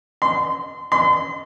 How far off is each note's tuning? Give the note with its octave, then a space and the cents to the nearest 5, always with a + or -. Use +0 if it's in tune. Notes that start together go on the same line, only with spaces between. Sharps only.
C6 -30
C6 -40